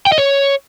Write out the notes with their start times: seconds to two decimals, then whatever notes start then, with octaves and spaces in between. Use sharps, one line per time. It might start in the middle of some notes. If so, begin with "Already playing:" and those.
0.06 G5
0.12 D#5
0.18 C#5